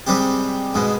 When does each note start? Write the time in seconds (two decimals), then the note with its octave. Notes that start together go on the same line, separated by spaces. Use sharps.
0.07 C3 G3 G#3 C4 G4
0.74 G#2 B2 G#3